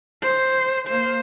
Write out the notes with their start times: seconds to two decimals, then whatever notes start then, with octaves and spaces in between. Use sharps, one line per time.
0.22 C5
0.88 A#3 C5